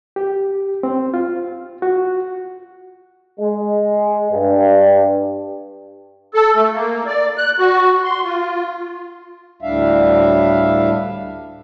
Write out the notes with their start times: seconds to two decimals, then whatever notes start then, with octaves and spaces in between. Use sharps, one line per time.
0.16 G4
0.83 C4
1.14 F4
1.82 F#4
3.39 G#3
4.31 G2
6.34 A4
6.56 A3
6.73 A#3
7.07 D5
7.38 F#6
7.59 F#4
8.04 C6
8.24 F4
9.62 D2 A2 G3 D4 E5 F5